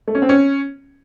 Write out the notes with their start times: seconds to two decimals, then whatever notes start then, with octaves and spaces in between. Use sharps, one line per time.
0.08 A3
0.15 C#4
0.22 C4
0.29 C#4